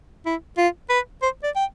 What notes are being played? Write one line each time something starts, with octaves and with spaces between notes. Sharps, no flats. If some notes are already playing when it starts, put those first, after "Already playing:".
E4
F4
B4
C5
D5
G5